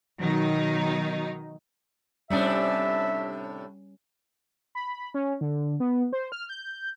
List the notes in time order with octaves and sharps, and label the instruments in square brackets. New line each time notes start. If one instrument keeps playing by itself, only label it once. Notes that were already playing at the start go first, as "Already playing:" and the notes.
[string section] B2 D#3 F#3 D#4
[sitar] A2 C3 D4 [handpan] G3 C#4 [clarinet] E5
[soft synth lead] B5
C#4
D3
B3
C5
F6
G6